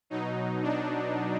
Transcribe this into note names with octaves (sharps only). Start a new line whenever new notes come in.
B2 F#3 D#4
D4